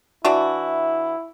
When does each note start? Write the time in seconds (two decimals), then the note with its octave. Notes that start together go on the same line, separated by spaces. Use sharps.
0.25 E3 D4 E4 F#4